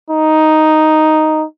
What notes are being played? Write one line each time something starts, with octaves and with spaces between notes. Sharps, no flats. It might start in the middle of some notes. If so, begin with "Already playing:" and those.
D#4